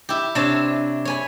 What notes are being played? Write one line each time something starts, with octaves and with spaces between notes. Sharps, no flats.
E4 G4
C3 D4 C#5 A5
C#5 G#5 B5